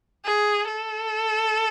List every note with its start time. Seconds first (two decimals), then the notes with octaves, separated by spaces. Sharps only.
0.25 G#4
0.67 A4